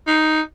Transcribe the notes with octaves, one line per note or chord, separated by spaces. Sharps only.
D#4